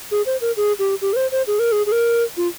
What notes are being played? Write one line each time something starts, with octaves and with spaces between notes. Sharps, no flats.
G#4
C5
A#4
G#4
G4
G4
A#4
C5
C5
G#4
A#4
G#4
G#4
A#4
F4